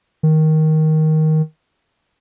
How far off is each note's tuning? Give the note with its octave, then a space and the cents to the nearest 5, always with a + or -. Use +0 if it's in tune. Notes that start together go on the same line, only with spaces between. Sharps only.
D#3 +10